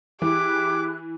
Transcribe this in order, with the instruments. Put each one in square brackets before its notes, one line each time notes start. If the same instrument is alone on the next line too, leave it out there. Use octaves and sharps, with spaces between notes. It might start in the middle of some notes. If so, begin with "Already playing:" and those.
[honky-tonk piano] E3 [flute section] E4 G#4 F#6 [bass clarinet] G4 [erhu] D6